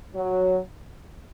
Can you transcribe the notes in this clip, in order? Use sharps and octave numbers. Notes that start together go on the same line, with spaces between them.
F#3